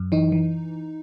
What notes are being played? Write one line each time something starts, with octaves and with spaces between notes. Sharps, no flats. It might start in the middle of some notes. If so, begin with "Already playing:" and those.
Already playing: F#2
E3 D#4
E3